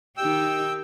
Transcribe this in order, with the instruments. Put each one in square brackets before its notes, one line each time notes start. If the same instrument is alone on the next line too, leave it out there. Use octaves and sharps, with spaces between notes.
[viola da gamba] D#3 D#4 G4 [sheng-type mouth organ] G5 E6